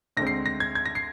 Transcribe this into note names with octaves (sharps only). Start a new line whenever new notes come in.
D2 D3 G#3 C4 A#6
C7
A#6
G#6
G#6
A#6
C7